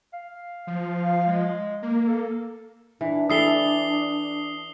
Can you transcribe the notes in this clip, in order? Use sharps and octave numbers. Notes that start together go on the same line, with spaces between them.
F5
F3
G#3
A#3
A4
E3 D4
E3 A4 D#6 C7 G7